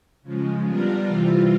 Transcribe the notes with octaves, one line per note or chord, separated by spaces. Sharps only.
C#3 F3 G#3
G3 B3 D4 F4 A#4
C3 E3 G3 C4 F4